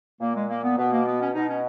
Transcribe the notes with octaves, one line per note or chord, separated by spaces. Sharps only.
A#2 A#3
G#3
A#3
B3
B2 B3
A#3
B3
C#4
B2 D#4
C#4